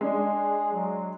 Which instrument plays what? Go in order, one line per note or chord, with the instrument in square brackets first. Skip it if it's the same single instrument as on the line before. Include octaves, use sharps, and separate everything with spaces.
[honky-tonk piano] G#3 D4 [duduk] G#4
[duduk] F#3